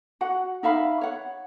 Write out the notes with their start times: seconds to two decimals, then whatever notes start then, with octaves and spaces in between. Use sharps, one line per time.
0.21 F#4 F#5
0.63 D#4 E5 F5 B5
1.01 C#5 F#5